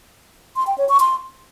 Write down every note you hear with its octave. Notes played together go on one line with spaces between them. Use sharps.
C6
G5
C#5
C#6
C6